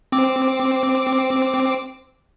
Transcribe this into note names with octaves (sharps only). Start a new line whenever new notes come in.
C4 D6